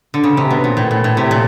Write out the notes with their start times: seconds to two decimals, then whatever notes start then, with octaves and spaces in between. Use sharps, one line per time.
0.14 D3
0.24 C#3
0.37 C3
0.51 B2
0.64 A#2
0.77 A2
0.91 A#2
1.04 A2
1.17 C3
1.31 A#2